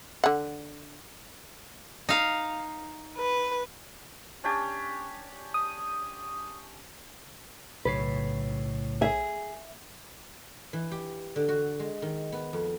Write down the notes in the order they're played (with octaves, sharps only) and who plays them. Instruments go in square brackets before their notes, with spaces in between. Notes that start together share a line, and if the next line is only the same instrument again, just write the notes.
[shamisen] D3 F#5
[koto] D#4 F5
[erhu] B4
[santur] C#4 D4 G4
[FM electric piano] D#6
[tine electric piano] B1 C#5 C7 [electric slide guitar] A2 C#3 [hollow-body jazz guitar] B4
[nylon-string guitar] G#4 [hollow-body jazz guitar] E5
[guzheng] E3
G4
D3
F#4
G#3
D#3
B3
F2